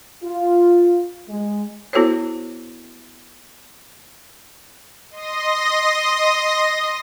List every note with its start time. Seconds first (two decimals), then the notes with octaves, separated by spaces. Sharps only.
0.24 F4
1.28 G#3
1.93 B3 E4 F#4 A4 C5 C#5
5.11 D#5 C6 D#6 A#6